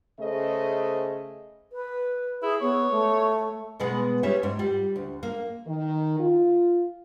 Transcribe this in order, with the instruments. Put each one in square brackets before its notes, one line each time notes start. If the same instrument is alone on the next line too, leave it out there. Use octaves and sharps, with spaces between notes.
[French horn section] C#3 A3 G#4 C5 D#5
[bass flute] B4
[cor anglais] E4 [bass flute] G#4
[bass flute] B3 [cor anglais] C#5
[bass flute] A3
[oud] B2 G#3 B3
G3 C#4 E5
G#2
G3
D2
A#3
[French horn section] D#3
F4